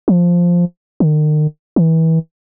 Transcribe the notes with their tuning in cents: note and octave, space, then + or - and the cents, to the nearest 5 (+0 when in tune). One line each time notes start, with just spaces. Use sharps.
F3 +0
D#3 -40
E3 -30